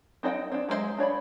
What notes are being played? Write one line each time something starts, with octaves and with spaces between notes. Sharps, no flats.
C4 D#4 D5 F#5 G5
C4 D4
F#3 G#3 B3 C5 E5
D4 C#5 D5 B5